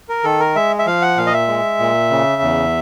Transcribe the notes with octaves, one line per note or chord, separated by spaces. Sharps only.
A#4
D#3 A4
A#4
G#3 E5
E5
F3 F5
F#5
A#2 F5
D#5
E5
G#3
A#2
C#3
E2